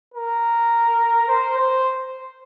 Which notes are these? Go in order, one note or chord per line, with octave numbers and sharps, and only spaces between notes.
A#4
C5
C5